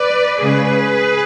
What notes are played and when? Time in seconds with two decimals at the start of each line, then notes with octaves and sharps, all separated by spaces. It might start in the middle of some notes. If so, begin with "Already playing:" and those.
Already playing: B4 D5
0.42 C#3 G#3 G#4 B4